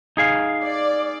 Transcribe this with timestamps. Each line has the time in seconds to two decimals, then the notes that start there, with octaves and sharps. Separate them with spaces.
0.17 D#4 G#4 F5
0.63 D5